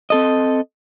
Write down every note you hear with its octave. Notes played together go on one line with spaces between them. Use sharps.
C4 A4 D#5